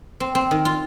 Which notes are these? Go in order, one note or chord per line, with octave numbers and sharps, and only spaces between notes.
C4
C4
D#3
F4